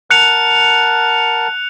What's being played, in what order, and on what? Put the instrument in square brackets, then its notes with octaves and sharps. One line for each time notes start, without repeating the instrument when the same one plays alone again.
[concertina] A#4 F#5 A5 [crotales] F#6 C#7 F7